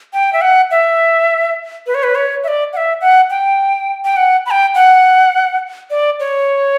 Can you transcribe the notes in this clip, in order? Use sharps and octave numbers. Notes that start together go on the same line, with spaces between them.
G5
E5
F#5
E5
B4
C#5
B4
C#5
E5
D5
F#5
E5
F#5
G5
G5
F#5
B5
G5
F#5
D5
C#5